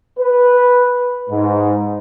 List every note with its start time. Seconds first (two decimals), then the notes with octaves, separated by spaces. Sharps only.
0.19 B4
1.30 G#2